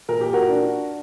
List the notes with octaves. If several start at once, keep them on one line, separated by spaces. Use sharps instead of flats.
A#2 A#4
G4
F#4 A#4
D4